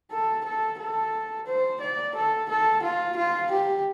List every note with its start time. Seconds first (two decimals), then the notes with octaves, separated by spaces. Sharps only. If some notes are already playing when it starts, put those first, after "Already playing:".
0.11 A4
0.45 A4
0.79 A4
1.47 C5
1.81 D5
2.16 A4
2.49 A4
2.83 F4
3.17 F4
3.51 G4